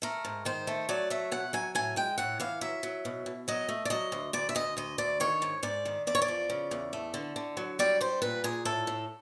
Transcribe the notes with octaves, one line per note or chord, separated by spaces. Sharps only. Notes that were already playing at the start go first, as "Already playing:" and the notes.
A3 A#4
G#2
D#3 C5
A3
F#3 D5
A3 E5
B2 F#5
F#3 G#5
A2 G#5
G#3 G5
A2 F#5
E3 F5
F#3 E5
F#3
B2
B2
F#3 D#5
A3
D5
F#3 D#5
D2
D2 D5
E5
D2 D#5
D2 D#5
D2 D5
D#3 C#5
G#2
G#2 D5
D#3
E2 D5
C#5
D5
F3
C#3
E2
A3
D3
D3
F#3
G3 D5
G3 C5
A#2 B4
A#2 G#4
A2 A4
A2